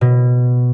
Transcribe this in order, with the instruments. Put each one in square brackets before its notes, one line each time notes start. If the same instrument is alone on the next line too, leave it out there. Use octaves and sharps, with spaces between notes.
[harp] B2